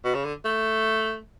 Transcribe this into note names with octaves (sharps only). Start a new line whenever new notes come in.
B2
C#3
D3
A3